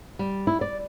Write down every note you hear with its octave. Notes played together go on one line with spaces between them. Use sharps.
G3
E4
D5